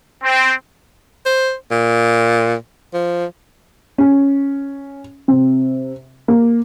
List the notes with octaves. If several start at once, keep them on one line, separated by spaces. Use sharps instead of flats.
C4
C5
A#2
F3
C#4
C3
A#3